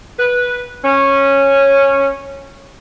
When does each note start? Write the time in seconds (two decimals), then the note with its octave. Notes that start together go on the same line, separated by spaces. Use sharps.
0.19 B4
0.85 C#4